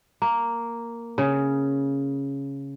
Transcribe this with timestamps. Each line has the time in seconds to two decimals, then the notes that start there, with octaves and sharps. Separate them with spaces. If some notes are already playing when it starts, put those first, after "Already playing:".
0.22 A#3
1.18 C#3